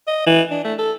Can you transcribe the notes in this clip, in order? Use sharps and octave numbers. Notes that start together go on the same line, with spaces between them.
D#5
E3
D4
A3
A4